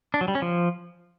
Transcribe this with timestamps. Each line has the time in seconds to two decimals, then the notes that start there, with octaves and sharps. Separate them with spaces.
0.14 D4
0.21 F#3
0.28 G3
0.35 C#4
0.42 F3